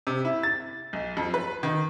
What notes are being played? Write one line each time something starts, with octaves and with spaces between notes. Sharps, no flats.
C3
E4
A6
B1
F2
B4
D#3